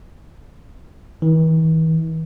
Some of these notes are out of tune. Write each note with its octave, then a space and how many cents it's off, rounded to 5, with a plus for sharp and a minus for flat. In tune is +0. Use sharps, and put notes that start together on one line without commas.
E3 -45